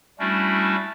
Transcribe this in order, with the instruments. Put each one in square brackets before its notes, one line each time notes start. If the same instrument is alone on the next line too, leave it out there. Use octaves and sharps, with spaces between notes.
[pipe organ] G3 A3 C#4 D4 E4 F#4